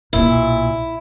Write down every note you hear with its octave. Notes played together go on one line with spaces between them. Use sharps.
B1 A#2 E4